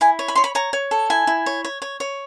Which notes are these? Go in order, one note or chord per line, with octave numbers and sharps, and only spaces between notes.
E4 G#5
C#5
B5
C#5 C6
B5
C#5 A#5
C#5
A4
E4 G#5
E4
C#5
C#5
C#5
C#5